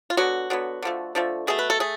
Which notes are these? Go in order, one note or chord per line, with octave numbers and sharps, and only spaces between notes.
F4
D3 F#3 B3 F#4
D3 F#3 B3
D3 F3 A3
D3 F3 A3
B2 A3 G#4
B4
A4
A3 G#4